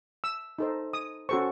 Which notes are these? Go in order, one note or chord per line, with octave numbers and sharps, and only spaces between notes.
E6
D#4 A4 C5
D#6
C#4 F#4 A4 C5 C#6